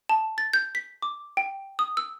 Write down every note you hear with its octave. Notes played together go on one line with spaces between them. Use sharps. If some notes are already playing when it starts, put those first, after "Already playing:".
A5
A6
G6
B6
D6
G5
D#6
E6